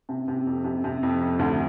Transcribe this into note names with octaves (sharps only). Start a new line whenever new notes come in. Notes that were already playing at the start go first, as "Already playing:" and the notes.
C3
C3
F2
C3
C3
F2
F2
D2